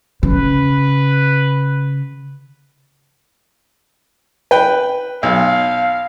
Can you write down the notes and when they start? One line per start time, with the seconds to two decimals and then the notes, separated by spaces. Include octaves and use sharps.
0.23 C#3 B4
4.51 B4 G5
5.23 B1 F5